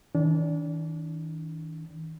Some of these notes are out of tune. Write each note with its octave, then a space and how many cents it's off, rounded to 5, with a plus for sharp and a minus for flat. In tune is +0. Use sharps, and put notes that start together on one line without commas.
D#3 +45 D4 -30